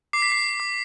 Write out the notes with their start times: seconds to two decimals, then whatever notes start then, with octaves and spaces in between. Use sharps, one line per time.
0.13 D6 C7
0.22 B6
0.32 C7
0.60 D6